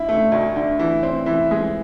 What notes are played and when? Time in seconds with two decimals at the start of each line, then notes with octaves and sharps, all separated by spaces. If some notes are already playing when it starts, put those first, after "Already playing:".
Already playing: D3 E4
0.08 A3
0.32 D2
0.56 D3
0.79 E3
1.03 C4
1.26 E3
1.51 G#3